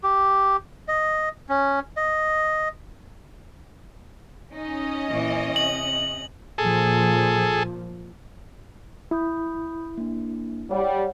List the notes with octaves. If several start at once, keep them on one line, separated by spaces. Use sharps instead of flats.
G4
D#5
C#4
D#5
C#4 D#4 D#5
A#2 E3
C3 F#7
A#2 F3 G#4 A4
E4 B5 D#6 G6
A#3 D4
G3 C#5 F#5